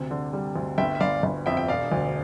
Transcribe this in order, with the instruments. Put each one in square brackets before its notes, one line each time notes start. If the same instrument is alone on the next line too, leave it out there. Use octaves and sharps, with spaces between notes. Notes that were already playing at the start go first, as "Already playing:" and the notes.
Already playing: [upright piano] D2 C3
D3
G3
D2
[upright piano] G1 [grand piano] E5 G5
[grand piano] E5
[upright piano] G1 [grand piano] D5 F5
[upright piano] G1
[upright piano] F2 [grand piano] E5 G5
[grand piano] G5
[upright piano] E1 [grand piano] D5 F5
[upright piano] D2